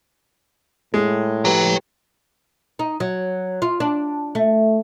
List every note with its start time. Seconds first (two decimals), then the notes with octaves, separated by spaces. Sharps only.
0.94 A2 G#3
1.45 G4 B4 C#5 G5 A#5
2.79 D#4
3.00 F#3
3.62 F4
3.80 D4
4.35 A3